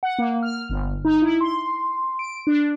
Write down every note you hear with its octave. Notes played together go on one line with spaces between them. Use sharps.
F#5
A#3
F6
G1
D#4
E4
C6
D7
D4